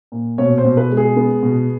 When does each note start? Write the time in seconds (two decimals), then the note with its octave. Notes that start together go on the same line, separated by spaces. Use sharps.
0.12 A#2
0.38 B2 C#5
0.58 C5
0.64 B2
0.77 B4
0.91 G#3
0.97 G#4
1.16 B3
1.43 B2